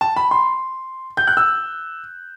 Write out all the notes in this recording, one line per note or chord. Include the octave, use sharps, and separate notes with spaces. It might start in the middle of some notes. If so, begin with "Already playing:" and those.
A5
B5
C6
G6
F#6
E6